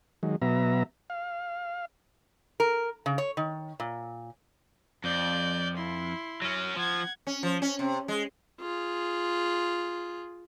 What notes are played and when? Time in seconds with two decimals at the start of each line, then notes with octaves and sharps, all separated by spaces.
0.23 D#3 F#3 G#3
0.42 B2 F#3 B3 E5 A#5
1.10 F5
2.60 A#4
3.06 C#3
3.18 C#5
3.37 D#3
3.80 A#2
5.04 F2 D5 G6
5.77 E4 C6
6.42 F#3 C#4
6.76 F3 F#5 G#6
7.27 C#4
7.43 F3
7.62 C#4
7.79 C3
8.08 G#3
8.61 F4 G#4